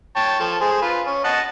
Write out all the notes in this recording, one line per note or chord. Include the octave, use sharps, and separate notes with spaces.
C#5 G5 A5
F3 A4
G#4 C5
F4 B4
C#4
D#5 F#5 A5